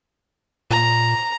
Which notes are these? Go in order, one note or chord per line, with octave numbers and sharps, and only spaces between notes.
A#2 A#5